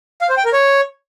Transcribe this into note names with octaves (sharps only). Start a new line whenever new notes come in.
F5
C5
G5
A#4
C#5